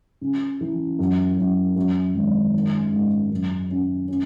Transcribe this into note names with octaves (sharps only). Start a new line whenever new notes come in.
C#3
E3
F#2
F#2
F#2
G#1
D#3
G#2
F#2
C#4
C#4